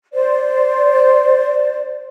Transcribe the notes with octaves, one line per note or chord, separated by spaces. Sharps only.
C5 D5